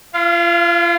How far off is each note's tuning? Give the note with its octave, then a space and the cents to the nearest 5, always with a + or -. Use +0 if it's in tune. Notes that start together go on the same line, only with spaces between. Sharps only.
F4 -35 F5 +0